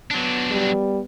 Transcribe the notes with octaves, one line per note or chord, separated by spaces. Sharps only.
F#3 B3 D4
G3